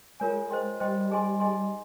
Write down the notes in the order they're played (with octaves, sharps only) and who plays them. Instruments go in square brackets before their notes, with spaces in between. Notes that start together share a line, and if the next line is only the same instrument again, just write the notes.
[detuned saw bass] G#3 [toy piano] F4 A#4 C#5 G#5
[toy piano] C5 D#5 G5 C6
[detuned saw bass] G3 [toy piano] C5 D#5 G5 C6
[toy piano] D#4 G#4 D#5 G#5 C6
D#4 G#4 D#5 G#5 C6